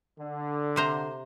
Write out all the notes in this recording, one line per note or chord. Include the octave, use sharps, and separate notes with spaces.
D3
C3 C5 A#5